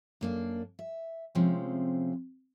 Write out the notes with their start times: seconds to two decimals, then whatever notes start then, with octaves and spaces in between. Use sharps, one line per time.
0.21 F#2 A#3 D4
0.79 E5
1.35 C3 F3 G#3 A3 C4 C#4